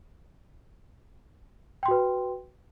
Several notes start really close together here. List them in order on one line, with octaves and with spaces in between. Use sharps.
G5 C6 F#4 B4